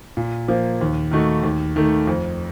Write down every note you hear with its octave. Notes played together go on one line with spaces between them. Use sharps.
A#2
F3 A#3
D#2
D#3 A3 D#4 F#4
D#2
D#3 A3
F2